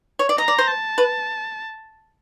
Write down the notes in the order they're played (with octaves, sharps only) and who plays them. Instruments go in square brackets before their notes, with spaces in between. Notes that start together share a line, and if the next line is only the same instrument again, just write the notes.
[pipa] C#5
D5
[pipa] D#5 [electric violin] A#5
[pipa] D5
C5
[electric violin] A5
[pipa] B4